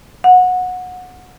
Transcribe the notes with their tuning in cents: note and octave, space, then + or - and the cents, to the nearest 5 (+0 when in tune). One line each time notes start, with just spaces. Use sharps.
F#5 -20